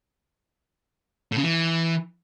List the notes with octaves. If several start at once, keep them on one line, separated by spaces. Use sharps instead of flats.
A2
C#3
E3